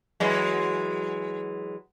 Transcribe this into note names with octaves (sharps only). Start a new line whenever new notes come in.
E3 F#3 G#3